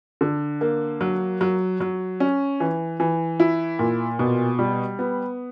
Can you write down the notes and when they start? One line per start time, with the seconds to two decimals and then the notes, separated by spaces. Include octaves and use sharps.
0.21 D3
0.61 A#3
1.01 F#3
1.41 F#3
1.80 F#3
2.20 C#4
2.60 E3
3.00 E3
3.40 E4
3.79 A#2
4.19 B2
4.59 G3
4.99 B3